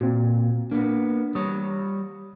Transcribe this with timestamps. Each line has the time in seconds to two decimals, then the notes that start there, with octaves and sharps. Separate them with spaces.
0.01 A#2 C4 F#4
0.71 A#3 B3 D4
1.35 G3 C#5 D#6